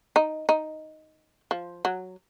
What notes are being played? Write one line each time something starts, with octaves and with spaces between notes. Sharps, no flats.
D#4
D#4
F3
F#3